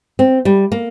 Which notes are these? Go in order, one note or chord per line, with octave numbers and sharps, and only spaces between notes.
C4
G3
A#3